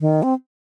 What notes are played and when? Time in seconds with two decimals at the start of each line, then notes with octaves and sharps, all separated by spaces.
0.01 D#3
0.23 C4